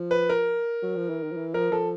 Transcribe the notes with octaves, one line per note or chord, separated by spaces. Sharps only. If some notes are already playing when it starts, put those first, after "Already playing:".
Already playing: F3
B4
A#4
F#3
F3
E3
D#3
F3
E3
F3 A#4
F3 A4